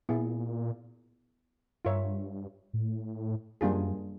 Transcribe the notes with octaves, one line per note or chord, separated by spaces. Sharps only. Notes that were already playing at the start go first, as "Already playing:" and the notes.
A#2 B3 E4 G#4
G2 F4 A#4 C#5 E5
A2
F#2 G3 A#3 D4 F4 G#4